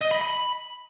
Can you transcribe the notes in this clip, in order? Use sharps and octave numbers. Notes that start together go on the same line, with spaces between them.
D#5
B5
B5